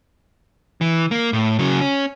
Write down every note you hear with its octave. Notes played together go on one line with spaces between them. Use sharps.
E3
A#3
A2
C#3 F#3
C#4